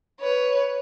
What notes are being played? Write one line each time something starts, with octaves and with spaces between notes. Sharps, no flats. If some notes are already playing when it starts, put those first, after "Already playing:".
B4 C#5